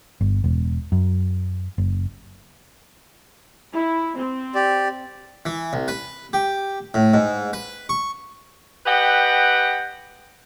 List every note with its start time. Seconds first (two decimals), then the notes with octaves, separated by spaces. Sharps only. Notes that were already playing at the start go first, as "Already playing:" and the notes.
0.21 G1
0.44 E1
0.92 F#2
1.78 F#1
3.74 E4
4.17 C4
4.55 G4 D5
5.46 E3
5.73 C2
5.88 B4
6.33 G4
6.94 A2
7.13 G#2
7.53 B4
7.89 C#6
8.86 G4 B4 D#5 F#5 G5